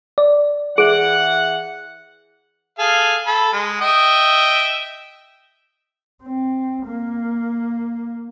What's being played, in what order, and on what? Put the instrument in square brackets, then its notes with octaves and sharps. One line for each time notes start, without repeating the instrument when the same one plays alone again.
[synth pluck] D5
[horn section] E3 F#5 [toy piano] G#4
[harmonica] G#4 A4 F5
A4 B5
G#3
D#5 E5 G5
[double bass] C4
A#3